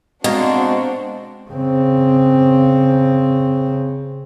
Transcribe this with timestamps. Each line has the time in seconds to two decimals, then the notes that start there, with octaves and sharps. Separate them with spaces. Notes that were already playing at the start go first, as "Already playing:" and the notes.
0.24 B2 G#3 C4 D4 F#4 D#5 F5 A#5
1.51 C#3 C4